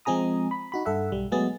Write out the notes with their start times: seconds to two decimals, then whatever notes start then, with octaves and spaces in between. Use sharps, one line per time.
0.05 F3 G#3 C4 G#4 A#5 D#6
0.51 B5
0.72 D#4 F#4 B5
0.85 G2 A4 E5 F#5
1.12 B1 G3
1.32 F#3 G#3 A3 B3 G#4 A6